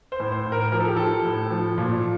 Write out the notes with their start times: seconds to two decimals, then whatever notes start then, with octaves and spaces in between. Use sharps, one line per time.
0.12 C5
0.20 A2
0.32 C5
0.46 A2
0.52 A#4
0.72 F3 A#4
0.80 A4
0.88 G4
0.96 F3 A4
1.25 A2
1.50 F3
1.78 A#2